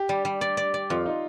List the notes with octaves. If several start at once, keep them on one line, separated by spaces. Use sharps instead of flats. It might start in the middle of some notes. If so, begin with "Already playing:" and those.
Already playing: G4
G3
G3
D5
D5
D5
F2 F4
D#4